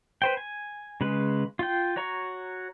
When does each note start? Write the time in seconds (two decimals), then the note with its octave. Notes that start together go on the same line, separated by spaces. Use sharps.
0.22 B4 C5 G5
0.37 G#5
1.01 C#3 G#3 B4
1.59 F4 G5
1.96 F#4 C#5 A#5 C#6